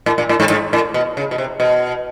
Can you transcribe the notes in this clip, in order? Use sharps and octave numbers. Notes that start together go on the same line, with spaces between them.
A2
A#2
A2
G#2
G#2
A2
B2
C#3
B2
C3
B2